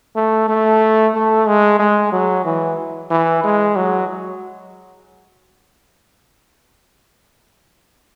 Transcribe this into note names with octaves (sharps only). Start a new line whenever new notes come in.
A3
A3
A3
G#3
G#3
F#3
E3
E3
G#3
F#3